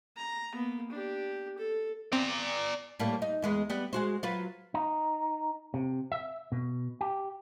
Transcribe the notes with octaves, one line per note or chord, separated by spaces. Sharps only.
A#5
A#3 B3
D4 G4
A4
C4 D5 A#5
A2 G3 A#3
D#4
E2 G#3 B3
G3 B3
G#3 F#4 C5
F#3 F4 B4
D#4
C3
E5
B2
G4